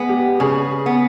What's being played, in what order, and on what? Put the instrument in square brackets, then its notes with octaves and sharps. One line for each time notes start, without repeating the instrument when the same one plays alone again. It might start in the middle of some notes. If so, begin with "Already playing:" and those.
Already playing: [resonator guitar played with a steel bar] G#3 B3
[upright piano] G4
[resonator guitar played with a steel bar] C#3 [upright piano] G#4
[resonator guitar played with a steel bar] B3